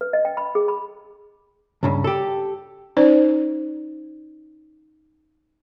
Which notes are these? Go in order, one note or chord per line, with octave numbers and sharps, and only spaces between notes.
B4
D#5
G5
B5
G#4
B5
C#2 G2 C#3
G4 A4
C#4 D#4 C5 D5